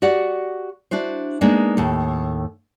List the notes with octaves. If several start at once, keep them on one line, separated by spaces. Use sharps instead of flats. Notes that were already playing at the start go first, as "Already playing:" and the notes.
F#4 G4 D5 F#5
D4 E4 F#4 C5
G#3 A#3 B3 D4 D#4
D#2 A2 A4